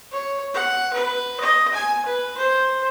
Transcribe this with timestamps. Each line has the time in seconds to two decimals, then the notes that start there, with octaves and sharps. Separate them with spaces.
0.11 C#5
0.54 F#5
0.93 B4
1.40 D#5
1.74 G#5
2.05 B4
2.37 C5